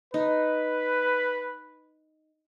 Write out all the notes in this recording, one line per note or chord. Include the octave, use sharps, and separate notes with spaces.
D#4 B4